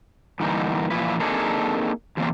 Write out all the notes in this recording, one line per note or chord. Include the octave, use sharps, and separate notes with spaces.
G2 D3 E3 A#3 D#4
A#2 E3 F3 E4 B4
A#3 C4 D4 D#4 G#4 A4
E2 C3 E3 A#3 C4 F4